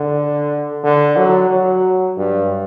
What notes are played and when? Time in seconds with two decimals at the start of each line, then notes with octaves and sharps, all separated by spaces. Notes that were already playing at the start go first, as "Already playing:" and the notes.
Already playing: D3
0.84 D3
1.17 F#3
1.50 F#3
2.17 G2